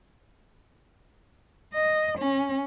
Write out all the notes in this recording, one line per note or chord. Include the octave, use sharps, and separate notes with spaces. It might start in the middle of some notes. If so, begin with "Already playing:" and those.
D#5
C#4